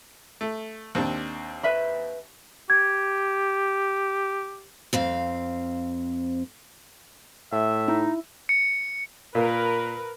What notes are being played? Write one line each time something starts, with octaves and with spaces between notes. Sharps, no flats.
A3
D#2 C4 D4
B4 E5 B5
G4 G#6
F2 C4 F5
A2 E5
D#4 E4
C#7
A#2 A#4 B4